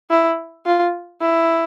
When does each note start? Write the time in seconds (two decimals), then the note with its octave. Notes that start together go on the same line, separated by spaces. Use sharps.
0.10 E4
0.66 F4
1.21 E4